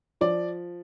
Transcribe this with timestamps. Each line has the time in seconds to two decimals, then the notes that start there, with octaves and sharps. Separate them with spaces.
0.21 F3 D5